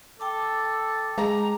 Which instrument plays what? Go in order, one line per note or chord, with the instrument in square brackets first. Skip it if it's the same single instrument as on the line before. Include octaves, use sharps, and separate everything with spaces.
[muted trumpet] A4 [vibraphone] G5 A5 D6
[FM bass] G#3 [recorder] A#5